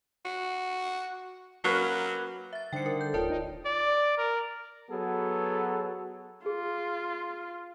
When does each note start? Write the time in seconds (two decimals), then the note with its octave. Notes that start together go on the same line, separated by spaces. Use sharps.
0.25 F#4
1.64 F#3 A#3 C#4 B4
2.53 E5 A6
2.73 D3 G3 D#4 C5 G5 C#7
2.86 A#4
3.01 A4 G6
3.14 D#1 F4 A#4 C#5 D5 G5 A5
3.30 D#4
3.65 D5
4.18 A#4
4.90 F#3 B3 G#4 A4
6.46 F4 G#4